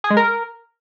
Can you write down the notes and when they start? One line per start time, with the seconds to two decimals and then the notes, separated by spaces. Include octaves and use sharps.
0.04 G#4
0.10 G#3
0.17 A#4